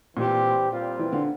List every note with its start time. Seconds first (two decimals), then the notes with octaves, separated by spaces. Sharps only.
0.16 A#2 E3 G3 C4 G4 C5
0.72 A#2 G3 C4 F4
0.99 E3
1.13 D3